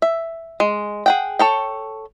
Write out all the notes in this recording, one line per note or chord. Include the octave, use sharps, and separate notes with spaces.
E5
G#3
G#4 F#5 G5
A4 C#5 G5